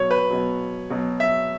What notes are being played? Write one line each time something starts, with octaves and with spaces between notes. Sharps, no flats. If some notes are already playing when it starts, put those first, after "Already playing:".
Already playing: B2 F#3 C#5
B4
B2 F#3
B2 F#3
E5